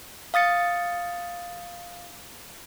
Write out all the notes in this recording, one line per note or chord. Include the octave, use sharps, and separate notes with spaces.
F5 D#6 A6 C#7